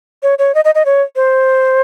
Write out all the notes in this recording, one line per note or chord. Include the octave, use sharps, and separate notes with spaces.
C#5
C#5
D#5
D#5
D#5
C#5
C5